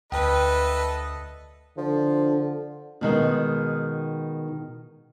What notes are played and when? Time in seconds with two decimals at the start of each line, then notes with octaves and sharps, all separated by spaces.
0.12 D2 A4 B4 D#5 G5
1.78 D3 F3
3.01 B2 D#3 G#3